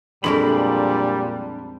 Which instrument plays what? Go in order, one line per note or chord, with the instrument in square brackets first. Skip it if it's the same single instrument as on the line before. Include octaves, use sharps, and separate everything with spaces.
[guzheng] F2 G#3 A#4 [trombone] A#2 [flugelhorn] G3 [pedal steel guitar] D4 B5